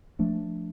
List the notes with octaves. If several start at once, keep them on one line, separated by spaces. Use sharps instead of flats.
F3 A3 D4